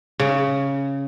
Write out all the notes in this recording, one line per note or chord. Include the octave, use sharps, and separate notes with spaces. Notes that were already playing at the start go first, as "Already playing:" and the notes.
C#3